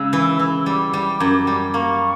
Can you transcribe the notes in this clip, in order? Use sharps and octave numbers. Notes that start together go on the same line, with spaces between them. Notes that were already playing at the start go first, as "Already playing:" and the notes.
Already playing: C#3 G#3 E6
E3
E3
G3 D6
G3
F#2
G3
D6
A#3 C#6